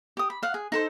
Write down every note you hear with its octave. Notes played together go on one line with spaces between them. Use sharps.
G4 D#6
B5
F5 F#5
G#4
D#4 A4 C5